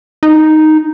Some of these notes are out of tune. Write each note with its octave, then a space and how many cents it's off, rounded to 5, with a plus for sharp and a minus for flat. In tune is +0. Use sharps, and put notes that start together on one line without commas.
D#4 +0